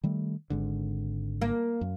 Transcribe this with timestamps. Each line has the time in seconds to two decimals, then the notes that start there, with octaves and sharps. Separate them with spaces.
0.04 D#3 G3 A3
0.50 G#1 G#2 D3
1.41 A#3
1.81 F#2